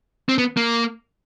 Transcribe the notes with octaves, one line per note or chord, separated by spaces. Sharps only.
C4
B3
A#3